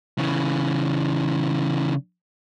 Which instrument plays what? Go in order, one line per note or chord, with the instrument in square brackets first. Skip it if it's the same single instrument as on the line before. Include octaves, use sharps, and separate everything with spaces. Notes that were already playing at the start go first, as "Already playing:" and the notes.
[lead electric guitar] C#3 E3